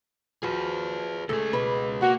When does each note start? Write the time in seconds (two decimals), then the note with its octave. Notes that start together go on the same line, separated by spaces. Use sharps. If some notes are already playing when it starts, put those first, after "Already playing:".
0.43 F3 F#4 G#4 B4
1.29 C#2 A3 G#4
1.53 B2 B4
2.02 A#3 F#4